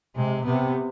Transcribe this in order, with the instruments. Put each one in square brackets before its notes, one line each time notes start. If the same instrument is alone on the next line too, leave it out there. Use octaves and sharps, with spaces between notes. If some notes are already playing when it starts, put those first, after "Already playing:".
[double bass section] C3 [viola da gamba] G#3
[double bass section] C3 [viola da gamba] B3